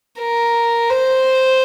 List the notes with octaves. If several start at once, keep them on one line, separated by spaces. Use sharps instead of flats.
A#4
C5